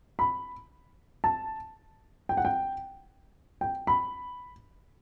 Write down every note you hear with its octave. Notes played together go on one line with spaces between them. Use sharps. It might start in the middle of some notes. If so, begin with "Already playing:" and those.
B5
A5
G5
F#5
G5
G5
B5